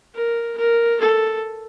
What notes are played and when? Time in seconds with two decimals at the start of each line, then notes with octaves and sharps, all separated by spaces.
0.15 A#4
0.57 A#4
1.00 A4